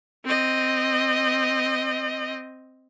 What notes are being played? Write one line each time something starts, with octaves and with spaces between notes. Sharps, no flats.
C4 D#5